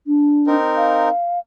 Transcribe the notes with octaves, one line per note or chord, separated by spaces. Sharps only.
D4
C4 D#4 A#4
F5